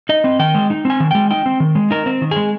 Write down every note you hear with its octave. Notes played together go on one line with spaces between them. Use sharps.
D#4 D#5
C4
D#3 G5
G#3
D#4
C4 G#5
D#3
G#3 G5
D#4 G5
C4
D#3
G#3
D#4 A#4
C4
D#3
G#4
G#3